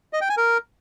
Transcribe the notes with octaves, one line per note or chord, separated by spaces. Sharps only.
D#5
G5
G#5
A#4